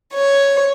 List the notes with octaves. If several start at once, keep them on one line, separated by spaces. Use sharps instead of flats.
C#5